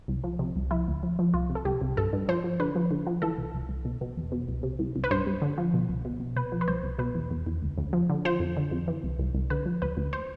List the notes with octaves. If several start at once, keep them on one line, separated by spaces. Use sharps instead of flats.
C2
F3
C3
C2
F3 E4
D2
F3
F3
C2 F4
C3
A4
C2 G4
C2
G2 A4
G2
F3 C5
F3
D3 B4
F3
D3
F3
E3 A4
C2
C2
C2
B2
B2
E2
B2
C2
C3
C2
C2
B4
G2 C5
G2
D3
F3
B2
C2
B2
B2
C2 B4
F3
B4
C2 C5
C2
B2 B4
E2
E2
E2
D2
D2
F3
D3
F3 C5
F2
D3
F2
E3
C2
C2
C2
D3 B4
F3
D2 B4
D2
C5